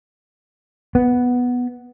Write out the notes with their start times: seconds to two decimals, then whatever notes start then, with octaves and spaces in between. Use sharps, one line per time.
0.95 B3